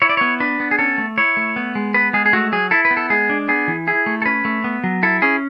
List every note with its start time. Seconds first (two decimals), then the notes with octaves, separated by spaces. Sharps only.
0.02 E4 C#5
0.09 D5
0.17 B3 C#5
0.40 D4 B4
0.60 B3
0.71 G#4
0.79 C#4 A4
0.98 A3
1.18 E4 C#5
1.37 A3
1.56 B3
1.75 G#3
1.94 B3 B4
2.13 G#3 G#4
2.26 G#4
2.33 A3 F#4
2.52 F#3 G#4
2.71 E4 A4
2.85 B4
2.91 B3
2.97 A4
3.10 G#3 G#4
3.30 D4
3.48 B3 G#4
3.68 E3
3.87 E4 G#4
4.06 A3
4.22 A4
4.26 C#4 B4
4.45 A3
4.64 B3
4.84 F#3
5.03 E4 A4
5.22 C#4 G#4